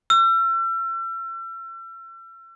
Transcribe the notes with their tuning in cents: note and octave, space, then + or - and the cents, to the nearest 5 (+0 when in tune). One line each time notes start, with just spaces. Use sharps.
E6 +40